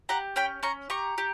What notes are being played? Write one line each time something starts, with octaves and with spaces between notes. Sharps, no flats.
G4 F#5 A#5
C#4 G5 B5
C#4 A#5 C#6
G4 A#5 C#6
G4